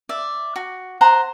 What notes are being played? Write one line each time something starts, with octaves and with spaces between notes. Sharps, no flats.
D5 E5
F#4
C5 F#5 A#5